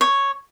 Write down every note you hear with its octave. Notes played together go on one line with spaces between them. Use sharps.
C#5